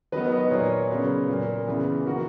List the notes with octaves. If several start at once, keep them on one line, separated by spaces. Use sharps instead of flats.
D#3 F#3 B3 B4 D#5
B4 D#5
A#2 A#3 A#4 C#5
C#3 F#3 B3
A#2 A#3
C#3 E3 B3
D#3 A#3 F#4 A#4